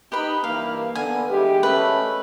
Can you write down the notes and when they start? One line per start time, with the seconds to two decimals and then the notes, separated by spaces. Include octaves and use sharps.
0.12 D#4 G4 B4 B5
0.44 G2 E3 A#3 F5
0.95 D3 B3 G#5
1.29 E3 G#3 G4
1.63 A3 C#4 B4 D#5